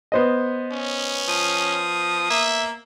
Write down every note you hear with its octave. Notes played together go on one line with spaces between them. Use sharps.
B3 C5 D#5
C#4
F3 D#6
A#3 E5